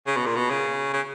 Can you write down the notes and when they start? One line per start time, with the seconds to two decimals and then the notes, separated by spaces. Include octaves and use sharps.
0.07 C#3
0.16 B2
0.26 A#2
0.36 B2
0.50 C#3
0.93 C#3